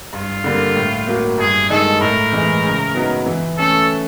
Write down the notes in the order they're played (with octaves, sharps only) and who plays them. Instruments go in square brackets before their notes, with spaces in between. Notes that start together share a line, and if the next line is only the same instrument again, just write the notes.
[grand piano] G2 [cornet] F4
[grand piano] D3 G3 A#3
A2
F#3 A#3
[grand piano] G2 [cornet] G#4
[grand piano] D#3 G#3 [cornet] A4
[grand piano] A2 [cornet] A#4
[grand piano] E3 G#3
C#3
F#3 B3 D#4
E3
[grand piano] A3 C#4 [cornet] A4